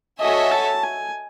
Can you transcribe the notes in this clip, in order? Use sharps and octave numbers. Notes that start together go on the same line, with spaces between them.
F#4 A4 C#5 D#5 E5 G#5
A5
G#5